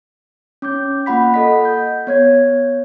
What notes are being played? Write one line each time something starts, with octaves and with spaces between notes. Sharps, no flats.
C#4 D6 G6
A#3 F4 F#5 B5 B6
A4 D#5 F#5 B6
G6
B3 C#5 G#6